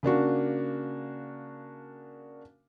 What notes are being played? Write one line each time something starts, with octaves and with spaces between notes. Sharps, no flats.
C#3 A#3 D4 F#4